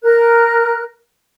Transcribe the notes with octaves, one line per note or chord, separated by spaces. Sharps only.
A#4 F#6